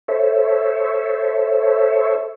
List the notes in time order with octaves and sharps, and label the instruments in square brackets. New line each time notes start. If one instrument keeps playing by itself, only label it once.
[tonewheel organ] A4 C5 C#5 E5